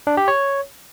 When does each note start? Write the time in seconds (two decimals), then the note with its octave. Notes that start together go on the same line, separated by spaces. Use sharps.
0.07 D4
0.17 G4
0.28 C#5